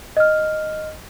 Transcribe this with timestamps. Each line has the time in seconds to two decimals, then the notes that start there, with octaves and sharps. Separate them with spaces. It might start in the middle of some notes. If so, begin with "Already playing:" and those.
0.17 D#5 F6